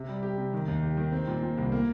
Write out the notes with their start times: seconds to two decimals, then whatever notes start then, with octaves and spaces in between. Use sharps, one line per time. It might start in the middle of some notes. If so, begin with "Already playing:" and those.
Already playing: C3
0.08 G3
0.23 G4
0.38 C3
0.53 D#3
0.68 D#2
0.83 G4
0.97 D#3
1.12 C4
1.28 A#2
1.43 A#2
1.57 C2
1.72 A#3